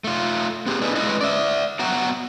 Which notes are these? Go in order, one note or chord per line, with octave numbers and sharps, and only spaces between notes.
A3 F4
B3 G4 G#4
D4 E4 G#4 A4 B4 D#5
G#3 A3 C#4 E4 B4 D#5
D5 E5
F#3 B3 F#4 F#5 G5 A#5